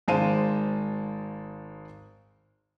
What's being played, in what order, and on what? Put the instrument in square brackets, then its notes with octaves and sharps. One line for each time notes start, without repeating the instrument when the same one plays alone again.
[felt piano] G#1 G#3 C5 F5 A5 D#7